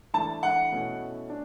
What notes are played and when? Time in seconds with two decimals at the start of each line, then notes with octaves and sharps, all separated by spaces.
0.14 E3 A3 D4 A5
0.43 F#5
0.72 B2 A3 C#4 E4
1.30 D4